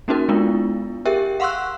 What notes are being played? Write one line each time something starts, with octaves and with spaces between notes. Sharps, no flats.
A#3 C#4 D#4 F#4 A#4
G#3 B3 D4 E4 F4
G4 G#4 A#4 E5 G5
F5 F#5 C6 C#6 E6 F#6